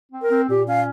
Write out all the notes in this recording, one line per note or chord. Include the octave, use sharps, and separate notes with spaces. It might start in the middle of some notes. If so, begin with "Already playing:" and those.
C4
A#4
C4
A#2 G4
C#4 F5